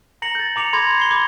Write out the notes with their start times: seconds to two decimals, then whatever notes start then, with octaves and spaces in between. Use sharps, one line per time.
0.22 A#5 A#6 C#7 F#7
0.35 G6 A6
0.56 A#5 D6 C#7 F7
0.73 B5 C6 D6 G#6 A#6
0.99 C7 G7
1.11 B5 C6 D6 G#6